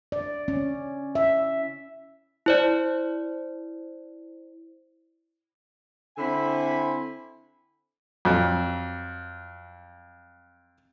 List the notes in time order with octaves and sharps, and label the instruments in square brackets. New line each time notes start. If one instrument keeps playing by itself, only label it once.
[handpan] D5
C#4
E5
[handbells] E4 C5 D5
[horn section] D3 C4 E4 G#5 B5
[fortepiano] F2 F#3